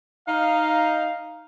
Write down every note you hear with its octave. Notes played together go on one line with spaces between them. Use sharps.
D#4 F5